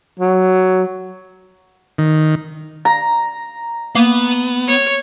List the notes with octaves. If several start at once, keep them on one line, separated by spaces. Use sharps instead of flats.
F#3
D#3
A#5
A#3 B3
C#5